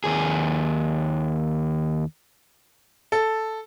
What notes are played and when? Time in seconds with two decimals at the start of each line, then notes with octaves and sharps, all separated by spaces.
0.04 D#2 G#4
3.12 A4